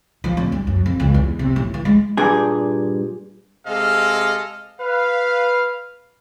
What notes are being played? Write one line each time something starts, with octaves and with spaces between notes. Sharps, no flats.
F3
D1
G2
F#2
F2
C#2
E2
C3
A1
E3
G#3
G2 A#2 G3 G#4
C3 G#3 A4 D#5 F5
B4 F5